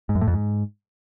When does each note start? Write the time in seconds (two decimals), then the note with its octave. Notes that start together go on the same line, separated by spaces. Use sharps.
0.09 G#2
0.15 F#2
0.21 A2
0.27 F2
0.34 G#2